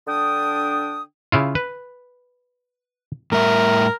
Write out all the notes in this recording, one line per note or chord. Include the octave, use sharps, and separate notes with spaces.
D3 D4 G5 D#6
C#3 E4 F4
B4
A2 G3 A#4 E5